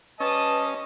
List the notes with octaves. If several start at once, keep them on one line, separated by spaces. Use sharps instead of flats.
G3 C#4 B4 D#5 A5 D#6